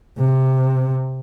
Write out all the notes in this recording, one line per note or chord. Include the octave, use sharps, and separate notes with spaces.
C3